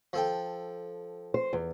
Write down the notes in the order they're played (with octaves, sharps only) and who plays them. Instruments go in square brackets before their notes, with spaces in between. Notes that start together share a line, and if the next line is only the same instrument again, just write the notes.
[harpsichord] F3 A4 G5
[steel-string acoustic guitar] C5
E2